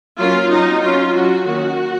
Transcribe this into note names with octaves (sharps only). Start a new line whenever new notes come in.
F#3 A#3 C#4 F4
F#3 C4 D#4
F#3 C#4 F4
F#3 C#4 F#4
D#3 A#3 C#4 F#4